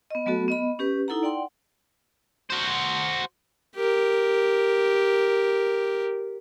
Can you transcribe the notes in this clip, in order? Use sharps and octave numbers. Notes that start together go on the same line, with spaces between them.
B3 D#5
F#3 A3 B3 F#4 A4
B3 D#5 B5
C#4 G4 B4
D#4 E4 A4 F#5 A#5
D5 F#5 G5 C6
F#4 C5
G4 A#4